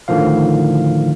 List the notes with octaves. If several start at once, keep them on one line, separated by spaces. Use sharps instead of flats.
A2 D3 D#3 F3 F5